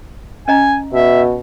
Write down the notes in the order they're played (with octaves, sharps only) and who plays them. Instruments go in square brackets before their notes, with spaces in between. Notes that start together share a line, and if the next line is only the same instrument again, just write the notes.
[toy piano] C#4 D#5 A#5 [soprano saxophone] G#5
[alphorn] B2 [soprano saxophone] E5